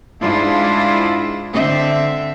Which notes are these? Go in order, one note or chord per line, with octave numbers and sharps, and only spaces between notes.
G#2 G#3 D4 E4 F4
D3 C4 E5